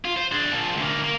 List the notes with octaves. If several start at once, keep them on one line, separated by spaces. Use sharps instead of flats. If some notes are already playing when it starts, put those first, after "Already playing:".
F4
C5
D4 G#4
A#2 F3
D2 A#3
A#3 A#4